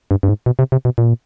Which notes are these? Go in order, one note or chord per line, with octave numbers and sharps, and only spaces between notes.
G2
G2
G#2
B2
C3
C3
B2
A#2